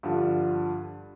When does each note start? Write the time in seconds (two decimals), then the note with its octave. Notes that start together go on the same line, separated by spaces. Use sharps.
0.03 G2 D3 F3